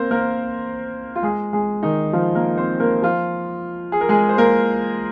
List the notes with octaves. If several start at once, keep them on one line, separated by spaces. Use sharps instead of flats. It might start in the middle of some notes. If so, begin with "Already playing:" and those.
Already playing: A#3 C4 A#4 C5
A#3 A#4
F4
G#3 G#4
G#3 G#4
D#3 D#4
F3 F4
A#3 A#4
C4 C5
A#3 A#4
F3 F4
G#4
A#4
G#3 G#4
C5
A#3 A#4